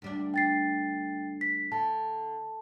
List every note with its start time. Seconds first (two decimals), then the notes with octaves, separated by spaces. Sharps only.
0.02 D2 G3 D4
0.34 G5 A6 C7
1.41 B6
1.72 D3 A5